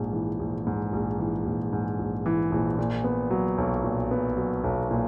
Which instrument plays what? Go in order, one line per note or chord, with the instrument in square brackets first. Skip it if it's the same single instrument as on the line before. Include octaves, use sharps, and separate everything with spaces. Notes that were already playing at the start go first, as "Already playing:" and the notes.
Already playing: [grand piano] A#1 G#2
E3
A#1
G#2
A#1
E3
A#1
G#2
A#1
E3
A#1
A#2
B3
F#3
B1
A#2
B3
F#3
B1
A#2